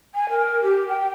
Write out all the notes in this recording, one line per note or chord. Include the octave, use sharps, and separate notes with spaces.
G#5
A#4
G4
G5